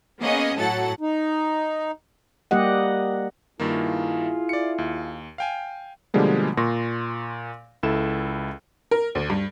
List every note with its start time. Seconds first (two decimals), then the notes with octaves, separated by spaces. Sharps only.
0.20 A#3 B3 C#4 G#4 D#5
0.56 A2 F#3 A4 F#5 A6
1.00 D#4
2.51 G3 A#3 G4 D#5 F#5
3.60 G2 D#3 A#3 E4 F4 G#4
4.49 D5 C#7
4.78 D#2
5.38 F5 G5 G#5
6.14 B2 D3 F3 G3 G#3 A#3
6.57 A#2 C6 C#6 A#6
7.83 C#2 E4 A4 E7
8.91 A#4
9.15 D2
9.30 G2